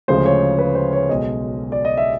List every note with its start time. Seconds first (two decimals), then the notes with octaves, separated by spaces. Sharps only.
0.08 D2 C#3 F3 G#3 C5
0.26 C#5
0.59 B4
0.75 C5
0.93 C#5
1.09 B1 B2 G#3 D#5
1.72 D5
1.85 D#5
1.97 E5